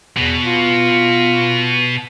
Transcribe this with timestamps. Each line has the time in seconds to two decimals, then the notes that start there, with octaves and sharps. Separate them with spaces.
0.17 E2 B2
0.45 F4